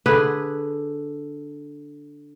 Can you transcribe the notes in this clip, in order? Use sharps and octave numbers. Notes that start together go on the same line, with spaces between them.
D3 G#4 B4